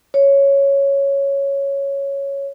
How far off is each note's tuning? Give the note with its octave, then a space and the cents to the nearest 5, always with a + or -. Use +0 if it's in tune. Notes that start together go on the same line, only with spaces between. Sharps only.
C#5 +0